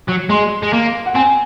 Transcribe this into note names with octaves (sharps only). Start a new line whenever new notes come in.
F#3
G#3 C6
G#3
A#3
F#5
C4 G#5